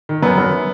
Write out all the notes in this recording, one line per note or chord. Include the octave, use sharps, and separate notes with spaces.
D#3
F#2 B3
F#2